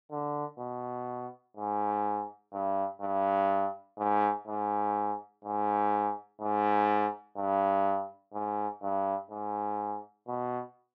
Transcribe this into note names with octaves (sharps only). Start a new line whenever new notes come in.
D3
B2
G#2
G2
G2
G#2
G#2
G#2
G#2
G2
G#2
G2
G#2
B2